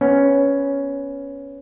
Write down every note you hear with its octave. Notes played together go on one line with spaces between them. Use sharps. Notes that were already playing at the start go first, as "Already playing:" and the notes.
B3 C#4